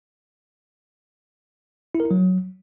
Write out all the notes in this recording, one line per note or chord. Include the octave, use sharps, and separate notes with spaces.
E4
A#4
E4
F#3